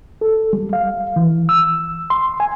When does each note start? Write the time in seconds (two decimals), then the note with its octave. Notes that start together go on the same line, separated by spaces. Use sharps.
0.21 A4
0.53 G3
0.73 F5
1.16 E3
1.49 E6
2.10 C6
2.40 G#5